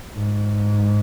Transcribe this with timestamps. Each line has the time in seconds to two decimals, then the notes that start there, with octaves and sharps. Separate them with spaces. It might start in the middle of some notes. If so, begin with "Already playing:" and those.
0.16 G#2